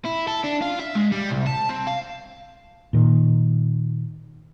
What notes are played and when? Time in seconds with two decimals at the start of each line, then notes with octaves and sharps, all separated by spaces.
0.06 E4
0.28 A4
0.44 D4
0.61 F4
0.79 E5
0.95 G#3
1.12 G3
1.30 C2
1.46 A5
1.69 C4
1.87 F5
2.93 A#2 D#3